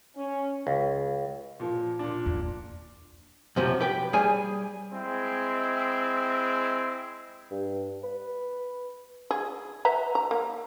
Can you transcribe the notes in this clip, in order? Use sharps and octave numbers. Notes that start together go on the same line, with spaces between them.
C#4
C#2
A#2 F3
A#2 D4
E2
F#2 C3 F3
G4 B4 G5
G3 G#4 G#5
G#3 C4 E4
G2
B4
G#4
B4 E5 A#5
A#5
A#3